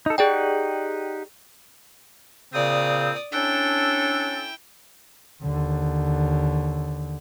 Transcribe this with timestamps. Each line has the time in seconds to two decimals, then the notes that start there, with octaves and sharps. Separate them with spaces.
0.06 D#4 A4
0.18 D#4 G4 G#4 D5 F#5 G5
2.53 A#2 C#3 C4 D5 D#6
3.32 C#4 D4 E4 A4 G5
5.43 D#2 D3